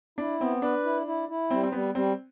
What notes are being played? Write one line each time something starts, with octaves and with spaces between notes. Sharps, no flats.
D4 E4
B3 C4
D4 B4
E4
E4
E4
G3 C4
C4
G3 B3
G3 C4